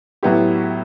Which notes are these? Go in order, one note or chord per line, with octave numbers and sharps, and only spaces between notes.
A2 F#3 B3 E4 G4